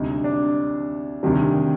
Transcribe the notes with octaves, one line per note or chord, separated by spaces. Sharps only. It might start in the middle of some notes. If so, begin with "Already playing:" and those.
Already playing: D2 C3 G3 D#4
D4
D2 C3 D#3 G3